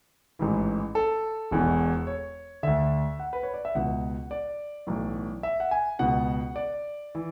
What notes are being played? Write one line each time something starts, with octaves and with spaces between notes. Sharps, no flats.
A1 G#2 E3
A4
E1 E2 B2
C#5
D2 D3 E5
F#5
B4
C#5
D5
E5
C#2 B2 F#5
D5
B1 A2 E3
E5
F#5
G#5
C#2 B2 F#5
D5
E3